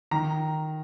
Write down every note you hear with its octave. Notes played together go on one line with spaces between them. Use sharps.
D#3 A#5